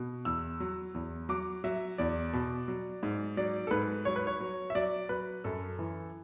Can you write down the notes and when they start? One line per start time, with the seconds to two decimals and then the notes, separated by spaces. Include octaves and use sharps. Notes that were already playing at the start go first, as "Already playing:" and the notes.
Already playing: B2
0.25 E2 E6
0.60 F#3
0.94 E2
1.29 F#3 D6
1.64 F#3 E5
1.98 E2 D5
2.33 B2
2.68 F#3
3.03 G#2
3.37 F#3 D5
3.67 A4
3.71 G#2 B4
4.05 F#3 C#5
4.16 B4
4.27 C#5
4.40 F#3
4.70 E5
4.75 F#3 D5
5.09 F#3 B4
5.44 F#2 A4
5.79 E3